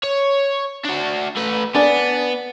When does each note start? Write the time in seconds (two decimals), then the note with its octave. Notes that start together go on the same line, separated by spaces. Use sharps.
0.03 C#5
0.85 D4 F#4
1.36 A3 B4
1.75 B3 D4 D5 G#5